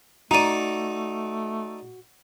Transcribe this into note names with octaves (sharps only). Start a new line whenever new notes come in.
A3 D#4 F#4 D5 A#5 D#7